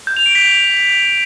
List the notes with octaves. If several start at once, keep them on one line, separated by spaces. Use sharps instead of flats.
G6
F7
D7
B6